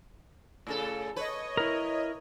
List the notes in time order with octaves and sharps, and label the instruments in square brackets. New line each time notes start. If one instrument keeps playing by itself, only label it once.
[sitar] A2 C#3 A4
[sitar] B4 [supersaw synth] C#5 D#5
[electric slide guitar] E4 A#4